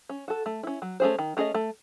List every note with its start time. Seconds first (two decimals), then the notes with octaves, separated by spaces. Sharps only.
0.09 C#4
0.28 F#4 A4
0.46 A3
0.63 C#4 E4
0.82 F#3
1.00 A3 C#4 G#4 C5
1.19 D#3
1.37 A3 C#4 G#4 D#5
1.54 A3